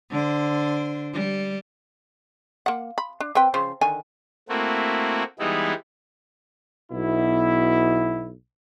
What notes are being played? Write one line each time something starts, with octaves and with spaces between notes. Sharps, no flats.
D3 D4 C5
G3
A#3 F#5
B5
D4
C4 B4 G5
C#3 F3 C5
D3 D#3 G#5
A3 A#3 C4 E4 F#4
E3 G3 G#3 B3 D#4 E4
B1 B2 E4